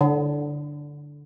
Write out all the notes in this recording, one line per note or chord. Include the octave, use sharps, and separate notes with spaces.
D3